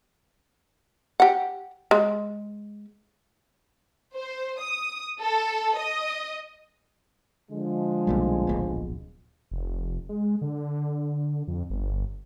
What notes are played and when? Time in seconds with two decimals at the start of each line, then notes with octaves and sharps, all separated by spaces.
1.20 G4 F#5
1.91 G#3
4.16 C5
4.59 D#6
5.21 A4
5.77 D#5
7.51 D3 F3 G#3
8.07 B1 A#2 G3
8.47 D1 A#1 B2
9.51 F1
10.09 G#3
10.41 D3
11.48 F2
11.70 G1